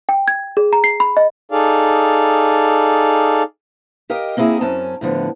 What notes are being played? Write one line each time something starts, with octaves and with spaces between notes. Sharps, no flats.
G5
G#6
G#4
A#5
C7
B5
D#5
D#4 G#4 A4 D5 F5
G4 A#4 D#5 F5 G5
A#3 C4 D#4 E4 G#4
F#2 C4 C#4 A5
A2 D3 F3 B3